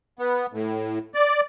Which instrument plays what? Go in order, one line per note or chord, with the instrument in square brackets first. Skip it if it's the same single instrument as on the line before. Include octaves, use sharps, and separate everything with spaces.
[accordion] B3
A2
D5